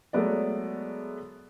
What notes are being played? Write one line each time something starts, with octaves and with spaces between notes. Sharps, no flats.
F#3 G#3 A3 B3 A#4 D5